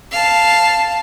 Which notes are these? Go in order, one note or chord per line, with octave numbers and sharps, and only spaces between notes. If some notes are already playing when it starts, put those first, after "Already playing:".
F5 A5